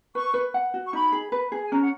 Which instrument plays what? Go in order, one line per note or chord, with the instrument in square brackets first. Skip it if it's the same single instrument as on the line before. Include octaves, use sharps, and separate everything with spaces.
[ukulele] B4 [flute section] C#6
[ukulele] B4
F#5
F#4
[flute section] C#6
[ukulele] D#4 [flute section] B5
[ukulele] G#4
B4
G#4
[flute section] G#5
[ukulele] C#4 [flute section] A#5
[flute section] F#5